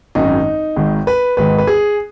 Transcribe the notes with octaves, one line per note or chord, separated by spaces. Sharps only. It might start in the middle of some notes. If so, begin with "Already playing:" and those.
G#1 F#2 D#3 D#4
G#1 G#2 D#3
B4
G#1 G#2 D#3 B4
B4
G#4